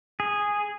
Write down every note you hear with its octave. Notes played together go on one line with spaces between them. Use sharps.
G#4